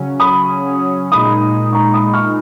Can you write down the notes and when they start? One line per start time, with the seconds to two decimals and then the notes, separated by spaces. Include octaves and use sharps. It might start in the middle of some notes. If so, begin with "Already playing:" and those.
Already playing: C#3 F#3 C#4
0.20 B5 D#6
1.12 A#2 G#3 D#4 B5 D#6
1.73 A#5 C#6
1.94 B5 D#6
2.13 C#6 F6